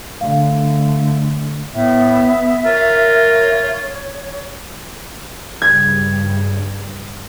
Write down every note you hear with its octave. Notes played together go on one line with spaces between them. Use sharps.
D3 A3 F5
A2 B3 E5
F4 A#4 C#5
G2 C#3 G3 G#6